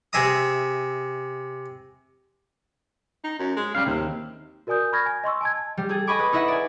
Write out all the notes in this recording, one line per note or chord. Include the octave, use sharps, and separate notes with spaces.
C3 G#4 E5 A#5 D#6
D#4
F#2
G#3
C#3 G3 F5
D#2 C3
F#4 A#4 D5 G#5 D#6 G6
B5 C#6 F6 G#6 A#6
G#5
D#5 C6 C#6 E6
G#5 A5 G#6
G3
G#4 A4
D#5 G#5 B5 C#6 D6
B4 D#6
D#4 E4 D#5 E5 F#5
D5 G#5